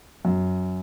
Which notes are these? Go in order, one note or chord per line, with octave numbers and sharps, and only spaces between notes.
F#2